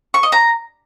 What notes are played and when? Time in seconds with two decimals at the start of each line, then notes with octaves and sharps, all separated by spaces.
0.14 C#6
0.23 D#5
0.32 A#5